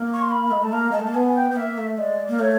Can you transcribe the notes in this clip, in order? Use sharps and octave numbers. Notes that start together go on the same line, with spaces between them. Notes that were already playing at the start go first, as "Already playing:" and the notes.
Already playing: A#3
C#6
C6
B5
G#3
A3 A5
A#3 A#5
G#3 A5
A3
A#3 A5
B3 G#5
G5
B3
A#3 E5
A3
G#3 D5
A#3
A3 C#5